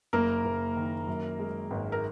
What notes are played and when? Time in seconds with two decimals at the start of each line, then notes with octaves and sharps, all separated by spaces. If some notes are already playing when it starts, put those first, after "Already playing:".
0.13 F#1 A#3 A#4
0.44 F#1
0.76 D#3
1.07 F#2
1.39 G#3
1.71 G#1
1.92 A#4